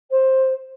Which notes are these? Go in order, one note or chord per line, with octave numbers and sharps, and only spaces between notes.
C5